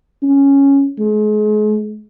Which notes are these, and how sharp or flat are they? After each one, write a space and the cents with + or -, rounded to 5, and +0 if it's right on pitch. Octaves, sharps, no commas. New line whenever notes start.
C#4 +0
G#3 +35